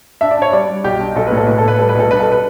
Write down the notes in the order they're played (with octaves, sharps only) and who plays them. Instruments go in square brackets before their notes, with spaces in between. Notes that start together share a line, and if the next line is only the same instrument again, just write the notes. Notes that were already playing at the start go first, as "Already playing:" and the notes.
[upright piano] D4 E5
D5
D4 C#5
G3 D5
G3
B1 G4
D4
B1 A4
A2 B4
A4
A2 B4
A4
A2 B4
G3 A4
B4
B1 A4
D4 B4
A4
D4 B4